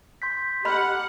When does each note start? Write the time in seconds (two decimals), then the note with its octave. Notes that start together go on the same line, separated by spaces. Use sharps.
0.22 C6 G6 B6
0.65 G4 D#5 F#5 A#5 B5 F6